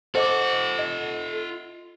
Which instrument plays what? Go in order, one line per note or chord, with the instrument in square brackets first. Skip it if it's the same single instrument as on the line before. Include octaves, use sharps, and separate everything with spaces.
[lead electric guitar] F4 F#5 [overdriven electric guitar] A4 [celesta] C5 D#5 D6
[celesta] D#5